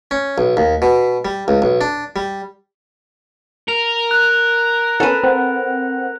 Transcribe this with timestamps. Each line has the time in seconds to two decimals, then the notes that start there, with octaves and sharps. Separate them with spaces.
0.11 C#4
0.38 B1
0.57 D#2
0.82 B2
1.25 G3
1.48 C#2
1.62 B1
1.81 D4
2.16 G3
3.68 A#4 F7
4.11 F#6
5.00 B3 C#4 A4 B4
5.23 C4 F#5